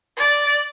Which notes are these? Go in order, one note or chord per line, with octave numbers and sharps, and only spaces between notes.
D5